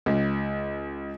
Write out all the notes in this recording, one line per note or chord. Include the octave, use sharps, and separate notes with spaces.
C#2